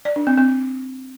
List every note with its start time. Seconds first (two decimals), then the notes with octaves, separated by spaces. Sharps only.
0.05 D5
0.16 D4
0.27 C4
0.38 C4